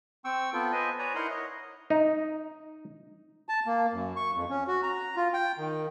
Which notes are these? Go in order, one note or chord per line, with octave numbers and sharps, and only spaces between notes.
C4 G5 C#6 E6
B3 F4 A4 G5
B4 C5 D#5 G#5
B4 C#5 D5 G#5 A#5
D#4 E4 A#4 F#5 A#5 C6
C#5 D#5
D#4
A5
A#3
F#2
C#6
F2
C#4
F#4
A#5
F4
G5
D#3